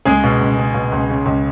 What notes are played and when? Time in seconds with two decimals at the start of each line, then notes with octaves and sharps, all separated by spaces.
0.05 C#2 G#3 G#4
0.24 B2
0.41 C#2
0.58 C#2
0.74 B2
0.92 C#2
1.10 C#3
1.26 C#2